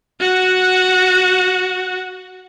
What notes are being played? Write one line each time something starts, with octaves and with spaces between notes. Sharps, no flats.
F#4 F#5